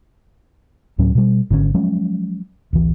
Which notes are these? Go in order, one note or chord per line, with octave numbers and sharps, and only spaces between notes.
D2 A2 F#3 C#4
B2 G3
G#1 D3 D#3 C#4
F3 F#3 G#3 C#4
D1 A1 E3